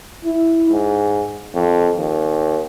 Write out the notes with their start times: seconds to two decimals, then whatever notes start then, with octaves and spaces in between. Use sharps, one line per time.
0.25 E4
0.70 G#2
1.54 F2
1.97 D#2